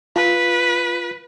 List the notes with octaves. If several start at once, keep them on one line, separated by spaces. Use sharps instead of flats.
F4 B4